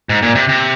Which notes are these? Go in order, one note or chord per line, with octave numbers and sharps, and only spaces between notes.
G#2
A#2
C3
C3